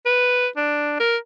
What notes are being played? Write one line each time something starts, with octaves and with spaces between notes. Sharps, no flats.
B4
D4
A#4